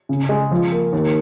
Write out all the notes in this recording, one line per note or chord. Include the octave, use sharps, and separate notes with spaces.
C#3
G#3
F3
A#3
D#2